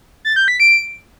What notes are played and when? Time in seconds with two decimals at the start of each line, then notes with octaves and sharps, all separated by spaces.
0.25 A6
0.36 G6
0.48 B6
0.60 D7